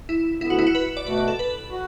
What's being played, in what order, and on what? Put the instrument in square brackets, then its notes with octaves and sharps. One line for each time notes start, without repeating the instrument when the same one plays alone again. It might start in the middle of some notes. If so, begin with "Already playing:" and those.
[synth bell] E4
[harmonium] D2 D3 B3 [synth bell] E4
[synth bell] F#4
E4
F#4
B4
D5
[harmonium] B2 A3 F#4 [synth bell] B4
[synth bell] D5
A4
B4
[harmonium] F#4